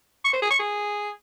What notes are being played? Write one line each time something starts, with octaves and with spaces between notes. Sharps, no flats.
C#6
C5
G#4
C#6
G#4